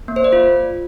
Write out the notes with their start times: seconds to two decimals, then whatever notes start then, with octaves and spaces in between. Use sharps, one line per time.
0.08 A#3
0.16 C5
0.24 D5
0.32 F4